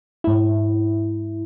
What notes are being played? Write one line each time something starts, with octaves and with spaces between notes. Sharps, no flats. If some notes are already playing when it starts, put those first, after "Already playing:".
G#2 E4